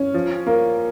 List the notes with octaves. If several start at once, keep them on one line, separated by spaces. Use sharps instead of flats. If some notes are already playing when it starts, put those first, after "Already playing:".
Already playing: C#4
F3
A#3